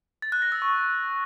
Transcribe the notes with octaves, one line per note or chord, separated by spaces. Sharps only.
A6
F#6
A#6
E6
C#6